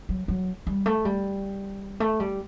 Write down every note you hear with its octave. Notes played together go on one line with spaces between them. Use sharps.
F#3
F#3
G3
A3
G3
A3
G3